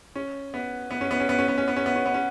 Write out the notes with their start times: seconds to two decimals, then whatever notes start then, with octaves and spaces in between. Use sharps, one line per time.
0.16 C#4
0.54 B3
0.91 B3
1.01 C#4
1.11 B3
1.20 C#4
1.29 B3
1.38 C#4
1.48 B3
1.58 C#4
1.68 B3
1.76 C#4
1.86 B3
1.96 C#4
2.06 B3
2.14 C#4